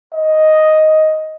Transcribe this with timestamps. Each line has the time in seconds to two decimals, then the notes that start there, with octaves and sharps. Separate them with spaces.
0.14 D#5